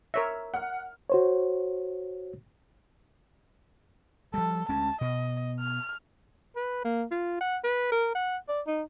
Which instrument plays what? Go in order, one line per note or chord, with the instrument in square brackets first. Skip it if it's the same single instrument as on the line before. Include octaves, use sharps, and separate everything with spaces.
[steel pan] A#4 C#5 E5
[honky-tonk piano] F#5 F6
[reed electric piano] F#4 C5 C#5
[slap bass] F3 G3 [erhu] A4
[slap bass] D2 G#3 C#4 [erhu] A5
[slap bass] B2 [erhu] D#5
[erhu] F6
[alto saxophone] B4
A#3
F4
F#5
B4
A#4
F#5
D5
D#4